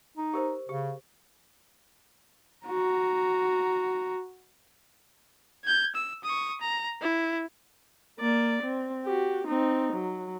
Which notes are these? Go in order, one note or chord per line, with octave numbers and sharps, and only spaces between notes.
D#4
G4 A#4 C5
C#3 G4
F#4 A#5
G6 G#6
E6
C#6 D#6
A#5
E4
A#3 D5
C4
F#4 G4
C4 D#4
F#3